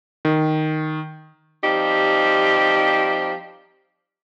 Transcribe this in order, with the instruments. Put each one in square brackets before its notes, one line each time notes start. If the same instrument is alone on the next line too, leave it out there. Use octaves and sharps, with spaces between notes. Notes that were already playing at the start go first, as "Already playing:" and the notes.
[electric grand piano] D#3
[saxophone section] F3 G3 C4 D#4 G4